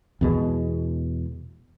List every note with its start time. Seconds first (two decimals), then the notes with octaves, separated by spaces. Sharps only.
0.21 E2 B2 G#3